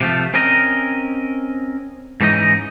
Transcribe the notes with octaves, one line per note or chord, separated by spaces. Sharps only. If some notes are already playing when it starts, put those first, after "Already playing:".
C3 F3 A3
C4 C#4 A#4 D#5
G#2 E3 C#4 D#4 D#5